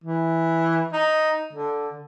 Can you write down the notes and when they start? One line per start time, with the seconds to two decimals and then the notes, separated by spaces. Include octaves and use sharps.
0.04 E3
0.93 D#4
1.53 D3